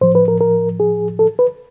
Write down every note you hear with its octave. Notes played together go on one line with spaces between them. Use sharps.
A2 F3 C5
B4
A#4
A#4
G#4
A4
B4